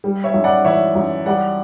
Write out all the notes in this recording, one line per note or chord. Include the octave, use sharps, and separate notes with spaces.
G3
C#5 E5
F#2
D5 F#5
E3 C#5 E5
F#2
G3 D5 F#5